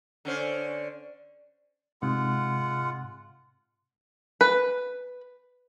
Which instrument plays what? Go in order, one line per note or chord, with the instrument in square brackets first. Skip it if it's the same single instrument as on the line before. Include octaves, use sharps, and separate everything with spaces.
[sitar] D3 C#4 C5
[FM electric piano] G#2 C3 [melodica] G#3 F4 F#5
[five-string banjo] B4